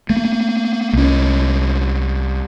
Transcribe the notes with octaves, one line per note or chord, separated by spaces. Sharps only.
A3 A#3
C2 C#4